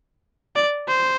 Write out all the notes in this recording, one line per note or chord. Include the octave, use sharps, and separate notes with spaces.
D5
C5